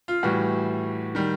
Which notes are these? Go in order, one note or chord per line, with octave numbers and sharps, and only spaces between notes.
F4
A2 E3 G3 F#4
D#3 G3